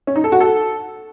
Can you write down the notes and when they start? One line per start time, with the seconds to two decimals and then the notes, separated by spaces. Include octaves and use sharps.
0.07 C#4
0.16 D#4
0.24 A4
0.32 F#4
0.40 A4